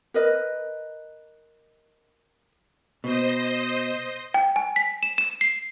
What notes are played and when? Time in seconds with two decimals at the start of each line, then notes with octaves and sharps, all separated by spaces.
0.14 A#4 B4 D#5
3.04 B2 C5 D#5
4.34 G5
4.56 G#5
4.76 B6
5.03 E7
5.18 E7
5.41 C7